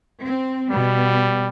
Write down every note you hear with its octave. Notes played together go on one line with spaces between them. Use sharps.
C4
B2 G3 B3